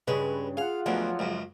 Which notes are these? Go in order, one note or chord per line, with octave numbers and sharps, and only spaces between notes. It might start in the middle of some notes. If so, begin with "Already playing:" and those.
G2 C#3 G#3 B4
F4 G#4 F5 F#5
D2 B2 F3 F#3
C#2 F#2